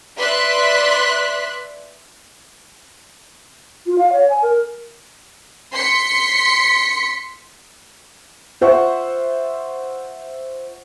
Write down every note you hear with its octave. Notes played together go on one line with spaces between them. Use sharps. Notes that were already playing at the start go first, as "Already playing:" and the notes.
B4 D5 E5 C6 F#6 B6
F4
F5
C#5
G#5
A#4
C6 B6 C#7
F4 C5 E5 F#5 C#6